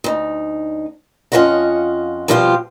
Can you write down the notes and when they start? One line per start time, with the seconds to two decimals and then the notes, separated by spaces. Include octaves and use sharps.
0.04 D2 D#4
1.32 F2 C#4 F4 C5 D#5 F#5
2.28 B2 F3 G3 C4 E4 F4